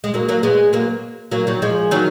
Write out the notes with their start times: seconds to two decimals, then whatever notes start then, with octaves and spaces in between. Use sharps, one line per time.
0.04 G#3
0.14 F#3 A#3
0.28 F#3 A#3
0.43 G#3 B3
0.73 F#3 A#3
1.31 F#3 A#3
1.47 D#3 F#3
1.62 F3 G#3
1.91 D#3 F#3